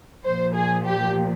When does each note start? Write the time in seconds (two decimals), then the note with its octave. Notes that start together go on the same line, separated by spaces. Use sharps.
0.24 A#2 F3 C5
0.55 G#4
0.85 G4